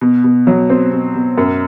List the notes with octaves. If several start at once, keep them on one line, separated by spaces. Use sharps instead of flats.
B2
B2
F#3
C4
B2
B2
F#2